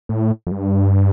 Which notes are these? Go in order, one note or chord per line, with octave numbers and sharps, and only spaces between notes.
A2
F2
G2